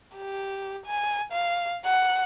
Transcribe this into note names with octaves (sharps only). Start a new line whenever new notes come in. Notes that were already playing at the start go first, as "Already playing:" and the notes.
G4
G#5
F5
F#5